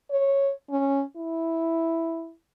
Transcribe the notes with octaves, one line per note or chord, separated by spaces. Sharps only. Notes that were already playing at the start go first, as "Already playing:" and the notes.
C#5
C#4
E4